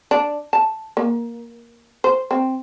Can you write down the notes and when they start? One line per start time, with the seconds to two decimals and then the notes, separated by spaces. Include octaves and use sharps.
0.11 D4
0.53 A5
0.97 A#3
2.04 C5
2.31 C4